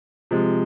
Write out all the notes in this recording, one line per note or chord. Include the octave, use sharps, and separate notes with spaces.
C3 F3 G#3